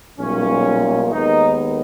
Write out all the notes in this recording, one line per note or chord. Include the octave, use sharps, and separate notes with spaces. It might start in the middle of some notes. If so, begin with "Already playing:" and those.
B1 A#2 G3 C#4
D#2 D#3 G#3 B3 D#4